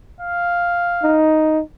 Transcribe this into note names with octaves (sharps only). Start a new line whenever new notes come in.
F5
D#4